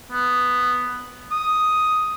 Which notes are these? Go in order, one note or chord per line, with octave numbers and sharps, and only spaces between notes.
B3
D#6